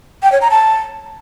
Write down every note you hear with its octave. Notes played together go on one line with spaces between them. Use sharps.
G5
C#5
A#5
A5